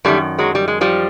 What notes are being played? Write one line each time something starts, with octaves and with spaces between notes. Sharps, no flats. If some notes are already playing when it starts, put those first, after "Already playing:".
F#2 D#3 G3 A3
F#3 G#3
G3
G#3
F3 G3